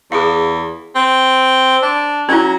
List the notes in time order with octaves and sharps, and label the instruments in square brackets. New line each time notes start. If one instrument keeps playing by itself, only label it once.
[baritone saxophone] E2 [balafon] G#4 F5
[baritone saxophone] C4
D4
[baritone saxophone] F#3 [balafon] C#4 E4